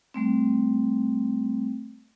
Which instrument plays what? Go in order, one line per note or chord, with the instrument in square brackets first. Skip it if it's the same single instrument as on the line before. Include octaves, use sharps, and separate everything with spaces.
[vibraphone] G3 A3 C4